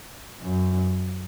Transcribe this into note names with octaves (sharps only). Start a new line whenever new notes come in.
F#2